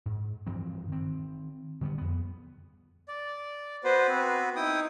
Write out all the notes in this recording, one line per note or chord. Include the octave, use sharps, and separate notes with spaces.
G#2
G2 E3 F3 C4
D#3 C4
D3 G3 A3 B3
F2 B3
D5
B3 F#4 B4 C5
C4
D#4 E4 G5 D#6